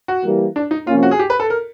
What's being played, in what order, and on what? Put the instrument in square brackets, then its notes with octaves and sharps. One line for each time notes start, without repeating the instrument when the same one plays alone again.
[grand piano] F#4
[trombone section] E3 G3 A#3
[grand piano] D4
D#4
[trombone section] C3 F3 A#3 C#4 [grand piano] F4
[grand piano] F#4
G#4
G4
B4
A4
A#4